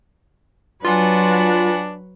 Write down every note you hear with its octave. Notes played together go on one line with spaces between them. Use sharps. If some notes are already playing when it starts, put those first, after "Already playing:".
F#3 D4 F4 B4 F#5 G#5